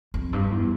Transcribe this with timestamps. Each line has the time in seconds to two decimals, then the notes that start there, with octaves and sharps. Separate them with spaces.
0.14 F2
0.33 G2
0.51 E2